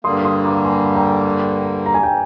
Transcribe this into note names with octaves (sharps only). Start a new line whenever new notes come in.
G2 D3 G3 A#3 C6 D#6
C6 D#6
A#5 D6
G#5 C6
G5 A#5
A#5
G#5
G5